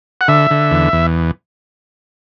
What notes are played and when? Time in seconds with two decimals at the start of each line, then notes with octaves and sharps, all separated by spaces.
0.21 F#5
0.28 D3 E5
0.51 D3
0.71 E2
0.93 E2